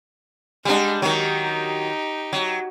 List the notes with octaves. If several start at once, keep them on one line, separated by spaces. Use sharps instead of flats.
G3 G#3 D4 F#5
D#3 F#3 D#4 G4
F#3